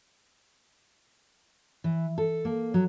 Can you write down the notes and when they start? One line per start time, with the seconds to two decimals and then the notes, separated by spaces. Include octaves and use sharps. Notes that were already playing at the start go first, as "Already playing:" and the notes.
1.84 E3
2.18 A4
2.45 A#3
2.74 F#3